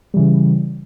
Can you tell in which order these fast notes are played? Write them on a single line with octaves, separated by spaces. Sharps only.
G3 E3 C#3